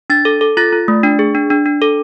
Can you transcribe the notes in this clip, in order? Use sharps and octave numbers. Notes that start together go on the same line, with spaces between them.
D4 A6
A4
A4
F4 A6
F4
A3
D4
G#4
D4
D4
D4
A4